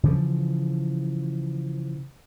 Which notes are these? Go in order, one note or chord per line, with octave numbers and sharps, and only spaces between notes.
C#3 E3 F3